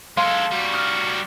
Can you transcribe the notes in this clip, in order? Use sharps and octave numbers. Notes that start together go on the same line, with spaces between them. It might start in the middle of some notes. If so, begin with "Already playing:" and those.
G#3 A4 F5 C6
G3 F#4
D#6 F6